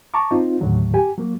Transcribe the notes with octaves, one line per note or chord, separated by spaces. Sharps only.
A5 A#5 C#6 D6
C4 D#4 F4
D#2 A2 D3 F#3
G4 G#5
F#3 A#3